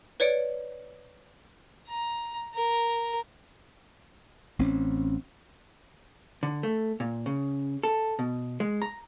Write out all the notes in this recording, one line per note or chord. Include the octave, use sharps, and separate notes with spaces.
B4 C#5 D5 C#7 D7
A#5
A#4
A1 C4 C#4
D3
A3
A#2
C#3
A4
B2
G#3
A#5